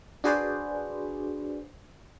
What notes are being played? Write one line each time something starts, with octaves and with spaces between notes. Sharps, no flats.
D4 F#4 G#4 B4 C5 D5